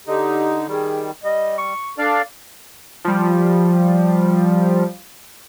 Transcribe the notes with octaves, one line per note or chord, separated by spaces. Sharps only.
D3 D#4 G4
D#3 G3 G#4
G3 D#5
C#6
D4 A4 D5 F5
F3 G3